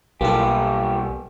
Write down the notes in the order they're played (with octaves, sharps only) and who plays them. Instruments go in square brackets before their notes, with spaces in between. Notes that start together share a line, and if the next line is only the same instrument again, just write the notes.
[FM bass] B1 [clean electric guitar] G3 B3 G4 [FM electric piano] A#3 A4